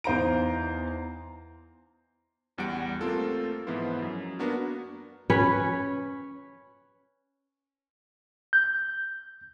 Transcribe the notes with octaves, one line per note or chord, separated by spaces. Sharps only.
E2 D#4 C5 F5 A#5 D7
A1 E2 G3 F#5 D7
A3 A#3 C4 F4 A4
G#2 E3 F3 B3 E4 F4
F#2
A#3 B3 D4 F#4 A#4
C#4 B4 C#5
G6